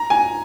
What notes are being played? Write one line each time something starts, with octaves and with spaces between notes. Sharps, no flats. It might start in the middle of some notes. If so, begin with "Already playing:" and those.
Already playing: A#5
G#5